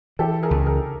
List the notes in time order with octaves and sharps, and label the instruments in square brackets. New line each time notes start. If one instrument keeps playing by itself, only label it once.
[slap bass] E3 [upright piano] G4 A4
[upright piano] G#4 A#4
[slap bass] C#2
[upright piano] G#4 A#4